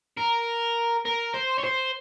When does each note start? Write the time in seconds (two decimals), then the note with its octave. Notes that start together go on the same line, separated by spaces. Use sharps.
0.17 A#4
1.05 A#4
1.34 C5
1.58 C#5
1.64 C5